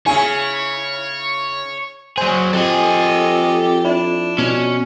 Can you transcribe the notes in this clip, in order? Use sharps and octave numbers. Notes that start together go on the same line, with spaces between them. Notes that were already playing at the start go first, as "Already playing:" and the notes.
C#3 E4 C#5 G#5
F#3 G#4 C5
F2 G4 A4 D#5 G#5
D4 E4
B2 C#4